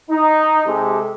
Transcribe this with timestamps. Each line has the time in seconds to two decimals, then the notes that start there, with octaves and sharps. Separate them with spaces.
0.10 D#4
0.66 C3 G#3 G4 A4